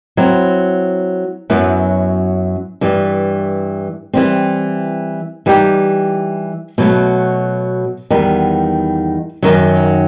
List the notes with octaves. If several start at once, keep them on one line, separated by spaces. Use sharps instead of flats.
F#3 C4 E4
F#2 F#3 B3 E4 B4
G2 E3 G3
E3 G3 C4
E3 G3 D#4 G4
B2 F#3 A3
E2 D#3 G3 B3
F#2 D#3 F#3